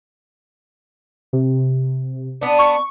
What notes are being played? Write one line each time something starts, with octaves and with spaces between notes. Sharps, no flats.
C3
B3 D4
C#6